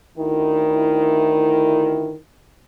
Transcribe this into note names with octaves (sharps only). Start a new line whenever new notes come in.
D2 D#3 E4